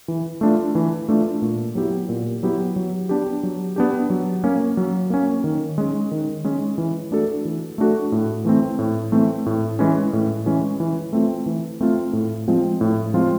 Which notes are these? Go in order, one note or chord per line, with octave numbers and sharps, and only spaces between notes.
E3
A3 D4 F4
E3
A3 D4 F4
A#2
F#3 B3 E4 G4
A#2
F#3 B3 E4 G4
F#3
B3 D4 G4
F#3
B3 D4 G4
F#3
A#3 C#4
F#3
A#3 C#4
D#3
G#3 C#4
D#3
G#3 C#4
E3
A3 D4 F#4 A4
E3
A3 D4 F#4 A4
A2
E3 A3 C4
A2
E3 A3 C4
A2
E3 G#3 C#4
A2
E3 G#3 C#4
E3
A3 C4 F4
E3
A3 C4 F4
A2
F3 G#3 C4 F4
A2
F3 G#3 C4 F4